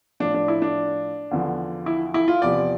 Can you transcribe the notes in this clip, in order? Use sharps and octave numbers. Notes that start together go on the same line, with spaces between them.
A2 F3 D4
D4
E4
D4
E2 D3 F3
E4
E4
F4
E2 C3 F3 D5